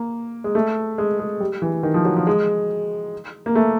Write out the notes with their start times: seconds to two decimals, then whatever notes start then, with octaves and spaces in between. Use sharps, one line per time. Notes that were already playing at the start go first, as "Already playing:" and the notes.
Already playing: A#3
0.44 G#3
0.55 A3
0.98 G#3
1.19 G#3
1.40 G3
1.62 E3
1.83 D#3
1.94 F3
2.05 F#3
2.17 F3
2.27 G#3
3.46 A#3
3.55 A3